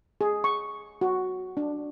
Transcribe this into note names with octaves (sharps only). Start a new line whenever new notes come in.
G#4
C#6
F#4
D4